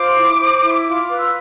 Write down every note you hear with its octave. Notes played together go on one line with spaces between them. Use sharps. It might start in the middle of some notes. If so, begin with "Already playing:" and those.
Already playing: F4 C5 D6
E4
C5
E4
F4 D6
D6
B4
E6